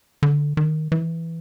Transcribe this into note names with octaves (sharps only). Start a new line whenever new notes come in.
D3
D#3
E3